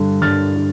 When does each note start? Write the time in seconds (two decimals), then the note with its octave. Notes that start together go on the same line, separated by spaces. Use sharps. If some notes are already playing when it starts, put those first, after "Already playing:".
Already playing: G2 D3
0.21 G2 F6 A6
0.56 D3